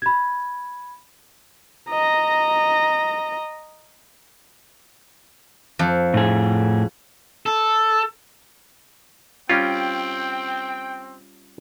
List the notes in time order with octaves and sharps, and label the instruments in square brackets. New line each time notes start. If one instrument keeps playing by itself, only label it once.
[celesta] B5 G#6
[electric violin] D#5 A#5
[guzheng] F2
[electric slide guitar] A2 G#4
[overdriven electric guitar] A4
[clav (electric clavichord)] G3 C#4 F4 [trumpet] C4 [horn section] G5